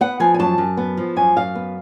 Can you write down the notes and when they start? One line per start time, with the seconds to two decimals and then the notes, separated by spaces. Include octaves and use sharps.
0.01 B3 F#5
0.20 F3 G#5
0.34 G#5
0.39 F#2 A5
0.58 F#2
0.77 B3
0.97 F3
1.16 F#2 G#5
1.36 F#2 F5
1.55 B3